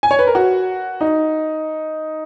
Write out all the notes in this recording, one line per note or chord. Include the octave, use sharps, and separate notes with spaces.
G#5
C#5
B4
A#4
F#4
D#4